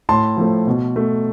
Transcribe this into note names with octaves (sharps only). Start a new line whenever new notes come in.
A2 A5 C6
F3 A3
B2
A3